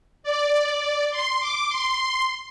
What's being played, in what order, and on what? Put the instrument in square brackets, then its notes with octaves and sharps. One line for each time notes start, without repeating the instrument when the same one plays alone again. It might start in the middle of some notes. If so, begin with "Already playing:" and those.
[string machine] D5
C6
D6
C6